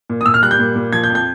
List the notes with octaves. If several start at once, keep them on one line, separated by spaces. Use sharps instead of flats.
A#2
D#6
A#2 E6
F6
G3 F#6
G6
A#2
A#2
F3 G#6
G6
F2
G6